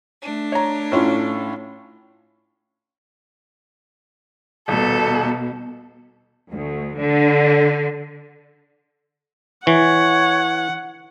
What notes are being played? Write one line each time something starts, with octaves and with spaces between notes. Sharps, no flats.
A3 D4
C#5 A#5
A2 C#4 F4
D#1 B2 A4
D2
D3
E3 C#5 F#5